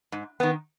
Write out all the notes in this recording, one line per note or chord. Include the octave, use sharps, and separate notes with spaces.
G#2
D#3 B3